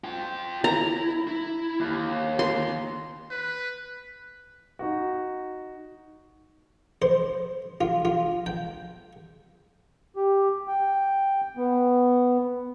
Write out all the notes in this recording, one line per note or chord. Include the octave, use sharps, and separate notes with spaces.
F4 G5
E4 A#5
E4
D#2
C6
B4
D#4 F#4
C5
F4
F4
G5
G4
G5
B3